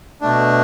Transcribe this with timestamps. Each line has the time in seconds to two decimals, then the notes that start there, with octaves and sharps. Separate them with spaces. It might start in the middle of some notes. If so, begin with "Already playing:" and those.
0.21 B2 A3 D4